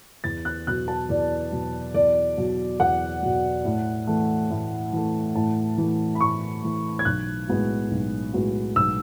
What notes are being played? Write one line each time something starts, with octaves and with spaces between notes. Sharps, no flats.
E2 A6
F#6
B2 F#3 F#6
A5
E2 D5
B2 F#3
E2 D5
B2 F#3
E2 F#5
B2 F#3
A2
E3 A3
A2
E3 A3
A2 A5
E3 A3
B5
A2 C#6
E3 A3
G#6
B1 F#6
A2 G#3 B3 F#4
B1
A2 G#3 B3 F#4
B1 E6